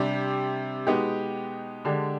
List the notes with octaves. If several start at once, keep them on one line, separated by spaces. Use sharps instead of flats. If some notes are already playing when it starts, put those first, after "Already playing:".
Already playing: C3 G3 D4 G4
B2 G#3 B3 D#4 G4
D3 G#3 D4 G4